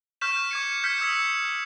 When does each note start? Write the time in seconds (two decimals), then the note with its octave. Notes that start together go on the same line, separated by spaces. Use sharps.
0.21 C#6 F6 G6 B6 E7
0.51 D6 G#6 C#7
0.84 F6 G6 G#6 B6 C#7
1.01 D#6 E6 G#6 B6 C#7